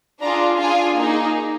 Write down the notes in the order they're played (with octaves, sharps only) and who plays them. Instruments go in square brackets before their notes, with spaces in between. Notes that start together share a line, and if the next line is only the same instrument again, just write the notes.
[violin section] D4 F4 G#4 A#5
D4 F4 G#4 G#5
A#3 D#4 G#4